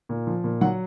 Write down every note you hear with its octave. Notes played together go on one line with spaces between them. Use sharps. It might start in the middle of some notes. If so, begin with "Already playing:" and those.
A#2
F3
A#2
F#3 F#5